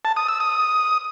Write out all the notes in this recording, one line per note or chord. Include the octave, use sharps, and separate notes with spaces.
A5
D#6
E6
D#6